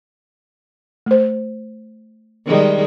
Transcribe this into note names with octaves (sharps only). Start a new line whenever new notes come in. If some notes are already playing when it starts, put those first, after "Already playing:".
A3 C5
D#3 G3 G#3